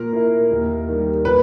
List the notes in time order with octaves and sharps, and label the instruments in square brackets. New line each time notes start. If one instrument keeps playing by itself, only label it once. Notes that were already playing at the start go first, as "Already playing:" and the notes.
Already playing: [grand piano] A#2 [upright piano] A#4
[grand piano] A#3 E4
D#2
D#3 G3
[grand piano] A#2 [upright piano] B4